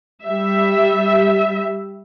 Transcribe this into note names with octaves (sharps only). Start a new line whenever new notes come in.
G3 E5